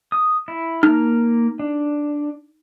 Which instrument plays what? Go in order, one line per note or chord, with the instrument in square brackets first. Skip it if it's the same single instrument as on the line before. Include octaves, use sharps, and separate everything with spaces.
[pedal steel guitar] D#6
E4
[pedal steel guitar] A#3 A#5 F6 [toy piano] D#4
[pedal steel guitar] D4